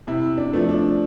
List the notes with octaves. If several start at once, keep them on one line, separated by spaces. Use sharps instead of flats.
C3 E4
D4
F3 A3
D4